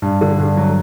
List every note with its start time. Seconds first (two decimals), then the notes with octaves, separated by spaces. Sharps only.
0.02 G2
0.21 D3
0.39 G2
0.57 F#3